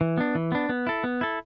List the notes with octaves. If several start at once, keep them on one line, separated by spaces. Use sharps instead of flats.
E3
B3 D4
E3
B3 D4
B3
E4 A4
B3
E4 A4